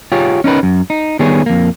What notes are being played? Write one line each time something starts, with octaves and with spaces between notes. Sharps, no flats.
F4 G4 G#4 C#5
C#4 D#4 A#4 B4
F#2
D#4
D#3 G3 B3 G#4 C#5
F2 A#3